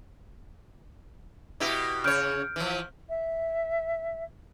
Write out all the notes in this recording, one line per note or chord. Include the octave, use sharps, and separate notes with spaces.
B2 E4 G4
C#3 C#5 F6 G6 D7
E3 F3
E5